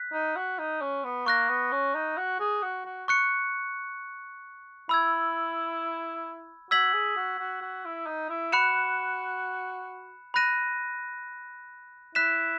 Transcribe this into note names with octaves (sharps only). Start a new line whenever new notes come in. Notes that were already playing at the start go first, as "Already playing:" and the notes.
Already playing: F#6 B6
D#4
F#4
D#4
C#4
B3
A#3 C#6 F#6 A#6
B3
C#4
D#4
F#4
G#4
F#4
F#4
C#6 F#6 C#7
E4 B5 E6 G#6
F#4 E6 G#6 B6 F#7
G#4
F#4
F#4
F#4
E4
D#4
E4
F#4 B5 F#6 C#7 E7
B5 F#6 A#6 D#7
E4 F#6 B6 E7